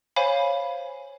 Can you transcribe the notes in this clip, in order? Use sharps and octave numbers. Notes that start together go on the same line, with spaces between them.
C5 C#5 F5 G#5 B5